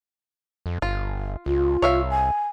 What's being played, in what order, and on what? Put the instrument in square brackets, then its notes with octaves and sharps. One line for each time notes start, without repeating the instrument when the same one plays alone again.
[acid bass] F2
[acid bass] G1 [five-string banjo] F4
[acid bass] C#2 [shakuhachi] F4
[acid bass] C2 [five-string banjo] C#5 E5 F5
[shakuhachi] G#5